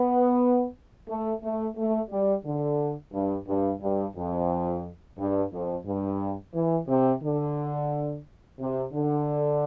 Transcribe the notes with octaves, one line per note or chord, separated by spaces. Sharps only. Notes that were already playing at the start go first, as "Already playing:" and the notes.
Already playing: B3
A3
A3
A3
G3
D3
G2
G2
G2
F2
G2
F2
G2
E3
C3
D3
C3
D3